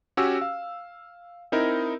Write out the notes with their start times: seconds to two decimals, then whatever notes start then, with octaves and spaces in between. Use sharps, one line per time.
0.17 C#4 F#4 G4 G#5 E6
0.41 F5
1.52 C4 D#4 E4 A#4